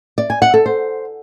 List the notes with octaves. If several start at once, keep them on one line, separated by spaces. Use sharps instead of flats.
D5
G#5
F#5
A4
C5